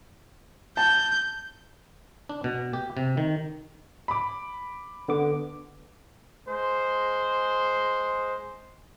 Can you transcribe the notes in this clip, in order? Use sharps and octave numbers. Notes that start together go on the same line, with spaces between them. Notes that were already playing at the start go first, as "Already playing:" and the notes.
A5 G6
D4
B2
G4
C3
D#3
B5 D6
D3 B3 D6
G#3 C5